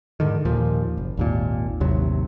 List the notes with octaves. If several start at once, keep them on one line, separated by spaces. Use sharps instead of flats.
G#2 D3 D#3
D#2 A#2 F3
F#1
G#1 D#2 A#2
A1 D#2 C3 F#3